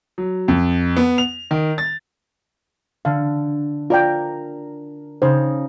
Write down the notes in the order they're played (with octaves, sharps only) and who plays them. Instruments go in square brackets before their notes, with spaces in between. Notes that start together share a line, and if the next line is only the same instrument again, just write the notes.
[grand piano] F#3
F2
B3
F7
D#3
A6
[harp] D3 [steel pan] F5
[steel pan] F4 D5 G5 [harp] A#4
[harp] C#3 D#4 [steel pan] C5